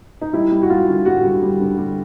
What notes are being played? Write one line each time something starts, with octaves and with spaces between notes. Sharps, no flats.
D#4
G3 E4
G3
F#4
G3 F4
D3
G3 F#4
D3
G3
D3
G3